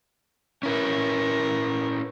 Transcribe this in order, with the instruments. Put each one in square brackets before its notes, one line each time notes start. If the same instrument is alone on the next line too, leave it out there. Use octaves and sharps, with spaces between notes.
[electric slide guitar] C#4 E4 B4 [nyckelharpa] A#4